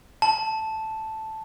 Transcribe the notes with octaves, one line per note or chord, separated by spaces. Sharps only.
A5